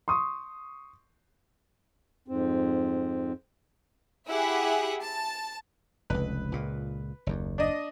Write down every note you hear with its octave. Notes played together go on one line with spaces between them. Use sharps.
C6 C#6 D#6
F2 G#2 C4
E4 G4 G#4 E5 F#5
A5
F1 C#2 B4
C#2 A#2
F#1 D#2
D4 D#5